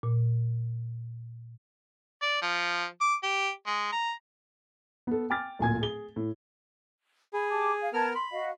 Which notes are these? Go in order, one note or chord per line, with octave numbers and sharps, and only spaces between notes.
A#2
D5
F3
D6
G4
G#3
A#5
B3 A4
G5 G#5 D6 F6 A6
D1 A#2 G#5 G#6
G#4 G7
A2
G#4 B5
G4 A5 D6
F5
B3 A#4 A5 F6 G#6
B5 C6
F#4 D#5 F5